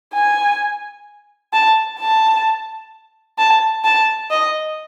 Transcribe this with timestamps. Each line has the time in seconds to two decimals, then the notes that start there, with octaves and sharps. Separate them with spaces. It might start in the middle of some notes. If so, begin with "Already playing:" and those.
0.14 G#5
1.53 A5
2.00 A5
3.38 A5
3.85 A5
4.31 D#5